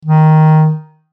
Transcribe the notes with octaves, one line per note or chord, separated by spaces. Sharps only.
D#3